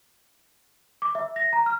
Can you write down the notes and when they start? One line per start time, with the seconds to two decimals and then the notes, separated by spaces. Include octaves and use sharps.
1.02 D6
1.15 E5
1.36 A#6
1.53 A#5
1.66 F6